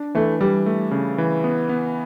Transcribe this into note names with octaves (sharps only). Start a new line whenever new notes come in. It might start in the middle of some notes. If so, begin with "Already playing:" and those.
Already playing: D4
E3 A3
E3 G3
A3
C#3
E3
B3
B3